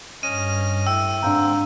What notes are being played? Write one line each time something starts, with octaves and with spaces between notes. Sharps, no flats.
G2 C#4 D#5 F6 D#7
A2 A3 G5 E6
G#2 D3 C4 D4 F5 G5 A#5